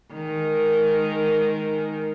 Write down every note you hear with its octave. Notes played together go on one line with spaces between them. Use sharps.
D#3 G#3 A#4